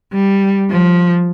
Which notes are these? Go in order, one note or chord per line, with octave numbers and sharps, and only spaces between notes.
G3
F3